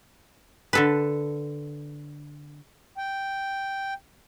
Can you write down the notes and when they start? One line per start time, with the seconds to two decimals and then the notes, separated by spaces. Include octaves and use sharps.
0.73 D3 A4 B4
2.98 G5